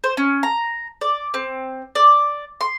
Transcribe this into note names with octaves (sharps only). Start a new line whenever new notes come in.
C5
C#4
A#5
D5
C4
D5
C6